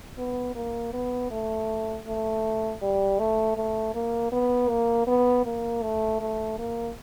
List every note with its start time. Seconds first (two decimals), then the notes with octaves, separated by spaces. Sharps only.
0.18 B3
0.55 A#3
0.93 B3
1.31 A3
2.06 A3
2.82 G3
3.19 A3
3.57 A3
3.95 A#3
4.32 B3
4.70 A#3
5.07 B3
5.46 A#3
5.82 A3
6.20 A3
6.58 A#3